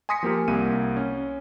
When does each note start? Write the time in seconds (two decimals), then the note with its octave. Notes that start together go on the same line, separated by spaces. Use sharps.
0.09 G#5 C6 D#6 A#6 B6 C#7
0.23 F3 A#3 G4 A#4
0.48 C2 A#3 D#7
0.97 C#4